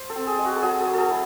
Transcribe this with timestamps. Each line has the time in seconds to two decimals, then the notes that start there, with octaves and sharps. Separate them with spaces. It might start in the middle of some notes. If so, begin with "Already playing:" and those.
Already playing: C5
0.10 A4
0.15 C4
0.27 G#4
0.39 G#3
0.45 F#4
0.56 A4
0.62 F#3 G#4
0.81 A4
0.86 F#3
0.93 G#4 A4
1.10 E4